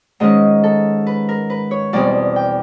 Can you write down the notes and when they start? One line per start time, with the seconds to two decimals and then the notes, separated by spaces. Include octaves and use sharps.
0.20 G#2 D#3 G#3 C#4 D#5
0.64 A4
1.06 B4
1.29 A#4
1.50 B4
1.71 C#5
1.93 E2 B2 G3 C4 D5
2.36 G5